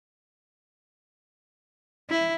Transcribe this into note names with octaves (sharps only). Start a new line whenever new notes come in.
E4